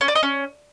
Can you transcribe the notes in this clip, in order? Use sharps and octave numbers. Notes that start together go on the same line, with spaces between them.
C#4
D5
D#5
C#4